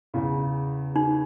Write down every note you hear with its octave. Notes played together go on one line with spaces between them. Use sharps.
E2 C#3 E3
D#4